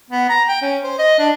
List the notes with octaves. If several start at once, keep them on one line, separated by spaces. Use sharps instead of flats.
B3
A#5
G5
C#4
C5
D#5
D4